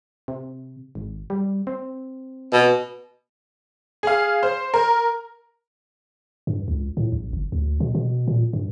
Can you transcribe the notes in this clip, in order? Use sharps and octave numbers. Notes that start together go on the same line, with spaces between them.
C3
G#1
G3
C4
B2
G#4 F5
C5
A#4
G2
C#2
A2
A#1
G1
D2
B2
B2
A#2
G2